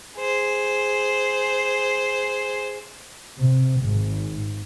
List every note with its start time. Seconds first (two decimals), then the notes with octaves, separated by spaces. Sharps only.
0.18 G#4 C5
3.38 C3
3.82 G#1